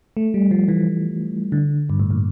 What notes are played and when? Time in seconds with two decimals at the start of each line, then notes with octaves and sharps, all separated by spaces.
0.17 A3
0.34 G3
0.51 F3
0.68 E3
1.52 D3
1.90 G2
2.00 A2
2.11 A#2